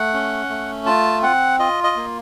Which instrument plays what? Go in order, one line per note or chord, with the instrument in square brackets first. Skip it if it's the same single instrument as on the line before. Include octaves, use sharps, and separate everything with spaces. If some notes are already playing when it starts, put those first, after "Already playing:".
Already playing: [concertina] A3 F#5
C#4
A3
F4 A5
C4 F#5
F4 D#5
D#5
A#3